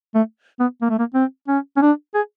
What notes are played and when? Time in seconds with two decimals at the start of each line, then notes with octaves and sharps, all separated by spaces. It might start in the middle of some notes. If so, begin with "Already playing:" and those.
0.15 A3
0.60 B3
0.82 A#3
0.90 A3
0.99 A#3
1.15 C4
1.48 C#4
1.77 C#4
1.82 D4
2.14 G#4